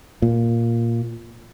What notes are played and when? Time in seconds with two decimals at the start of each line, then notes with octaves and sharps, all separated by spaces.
0.22 A#2